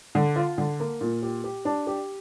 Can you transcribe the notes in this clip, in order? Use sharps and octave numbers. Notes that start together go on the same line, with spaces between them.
D3
F4
D3
A#3
A#2
G4
G4
D4
G4